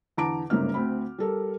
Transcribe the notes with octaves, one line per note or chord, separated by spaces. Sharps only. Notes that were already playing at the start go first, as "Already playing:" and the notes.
E2 D3 A5 A#5 D6 D7
G1 G#2 C#3 A#3 F6
D2 C4 B5
G3 A4 A#4